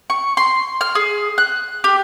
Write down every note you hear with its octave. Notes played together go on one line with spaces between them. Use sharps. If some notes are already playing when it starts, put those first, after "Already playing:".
C#6
C6
F6
G#4
F#6
G4